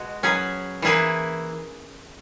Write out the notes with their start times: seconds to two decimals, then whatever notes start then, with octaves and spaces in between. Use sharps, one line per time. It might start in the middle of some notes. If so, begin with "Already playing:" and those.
Already playing: B2 G#3 F#4
0.23 F#3 C#4 G#4 B4
0.82 E3 A#3 E4 G#4 B4